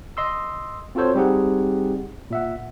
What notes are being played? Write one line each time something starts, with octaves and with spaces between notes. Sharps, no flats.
D#5 C6 E6
C4 F4 F#4 A4 C5 C#5
G3 C4 D#4 G4 G#4 F#5
A#2 E5 F#5